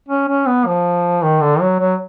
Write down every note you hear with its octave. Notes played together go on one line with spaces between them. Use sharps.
C#4
C#4
B3
F3
D#3
D3
F#3
F#3